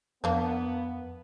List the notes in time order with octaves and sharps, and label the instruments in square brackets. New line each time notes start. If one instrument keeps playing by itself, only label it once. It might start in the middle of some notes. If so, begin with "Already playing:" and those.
[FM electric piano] F2 [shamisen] A#3 D4 [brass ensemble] B3